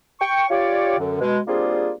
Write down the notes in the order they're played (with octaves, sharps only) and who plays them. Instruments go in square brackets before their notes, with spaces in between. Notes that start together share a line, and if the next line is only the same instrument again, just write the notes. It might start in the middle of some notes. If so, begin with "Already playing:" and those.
[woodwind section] G5 C#6
F4 G4 C#5 D5
F#2 D3
B2 G#3
G3 A#3 C4 D4 F4 G#4